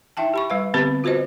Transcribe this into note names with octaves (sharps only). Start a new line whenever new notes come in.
D#4 E4 E5 G5 A5
G4 B5 C#6
G3 B4 F5
D3 B3 C4 G4 B4 B5
F4 F#4 B4 C5 D#5